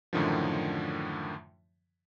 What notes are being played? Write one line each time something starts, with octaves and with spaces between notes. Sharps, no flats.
F#2 A2 D3 D#3 F3